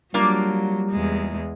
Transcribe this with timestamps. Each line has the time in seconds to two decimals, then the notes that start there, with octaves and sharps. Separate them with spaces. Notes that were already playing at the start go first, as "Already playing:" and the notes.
0.14 F#3 G3 A#3 D4 F4
0.91 E2 G#3